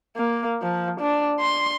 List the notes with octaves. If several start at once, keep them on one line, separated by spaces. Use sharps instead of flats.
A#3
F3
D4
C6